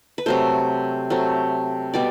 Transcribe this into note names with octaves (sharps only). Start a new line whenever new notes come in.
B4
C3 F#3 A3 C5
C3 F#3 A3
B2 G3 B3 D5